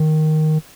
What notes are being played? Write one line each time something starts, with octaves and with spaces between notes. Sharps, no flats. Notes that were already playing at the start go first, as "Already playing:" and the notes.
Already playing: D#3